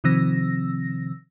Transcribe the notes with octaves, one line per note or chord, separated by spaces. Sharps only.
C3 D#3 F3 C4 E6 A#6